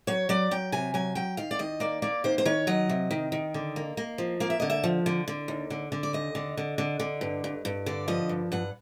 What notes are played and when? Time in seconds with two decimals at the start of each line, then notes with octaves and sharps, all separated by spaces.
0.07 F#3 C#5
0.29 F#3 D5
0.51 F#3 G5
0.72 C3 G#5
0.94 F#3 G#5
1.15 F#3 G5
1.37 D#3 F5
1.51 D5
1.59 D#3 D#5
1.80 A#3 D5
2.02 A#3 D5
2.24 D#3 C5
2.38 C5
2.45 D#3 C#5
2.67 F#3 D#5
2.89 C3
3.11 D#3
3.32 D#3
3.54 D3
3.76 A#3
3.97 A#3
4.18 F3
4.40 A#3 F5
4.50 E5
4.60 D3 D#5
4.70 E5
4.84 F3
5.06 D3
5.28 D3
5.48 D#2
5.70 D3
5.92 D3
6.03 D5
6.13 D#2 D#5
6.35 D3
6.57 D3
6.78 D3
6.99 D3
7.21 G2
7.44 G2
7.65 G2
7.86 D3 D5
8.08 F3 D#5
8.29 G2
8.52 G2 F#5